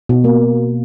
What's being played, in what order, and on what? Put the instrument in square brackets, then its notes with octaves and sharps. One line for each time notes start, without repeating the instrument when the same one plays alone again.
[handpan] B2
A#3